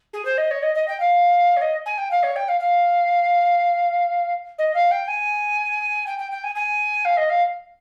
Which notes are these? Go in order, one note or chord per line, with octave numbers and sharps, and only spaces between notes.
G#4
C5
D#5
C#5
D#5
D#5
G5
F5
C#5
D#5
G#5
G5
F5
C#5
G5
F5
F5
D#5
F5
G5
G#5
G5
G5
G5
G#5
G#5
F5
D#5
F5